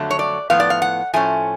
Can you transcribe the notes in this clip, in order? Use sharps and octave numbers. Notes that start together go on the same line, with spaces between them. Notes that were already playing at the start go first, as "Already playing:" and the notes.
Already playing: F2 D3 F#3 A3
C#5
D5
A2 F3 B3 F5
D5
F5
F#5
A2 F3 A3 C#4 G#5